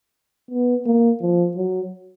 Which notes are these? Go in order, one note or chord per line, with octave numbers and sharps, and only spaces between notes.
B3
A#3
F3
F#3